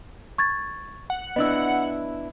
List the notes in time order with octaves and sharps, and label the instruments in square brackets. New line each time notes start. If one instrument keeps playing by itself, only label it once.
[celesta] C#6 G#6 A6
[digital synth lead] F#5
[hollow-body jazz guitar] B3 D4 E4 [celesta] D#5 E6